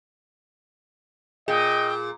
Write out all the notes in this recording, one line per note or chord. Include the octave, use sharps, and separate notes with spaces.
A#2 G#4 D#5 G5